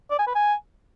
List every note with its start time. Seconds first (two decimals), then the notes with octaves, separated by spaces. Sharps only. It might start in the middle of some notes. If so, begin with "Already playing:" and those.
0.11 D5
0.19 G#5
0.27 B4
0.35 G#5